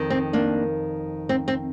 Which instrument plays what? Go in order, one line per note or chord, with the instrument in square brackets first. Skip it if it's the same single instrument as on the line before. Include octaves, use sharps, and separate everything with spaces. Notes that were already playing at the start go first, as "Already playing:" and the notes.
Already playing: [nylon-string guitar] F2 D#3
C4
A#3 D4
C4
C4